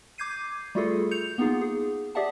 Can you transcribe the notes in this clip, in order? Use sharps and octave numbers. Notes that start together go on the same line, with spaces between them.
D6 G6 G#6 C7 D#7
G3 A3 F4 F#4 G#4 A4
G6 C#7 F7
A#3 B3 D#4 F4 G#4
G#4
G4 G#4 D5 E5 F#5 A5